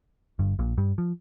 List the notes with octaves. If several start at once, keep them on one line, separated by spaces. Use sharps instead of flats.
G1 G2
A#1 A#2
G2 G3
F3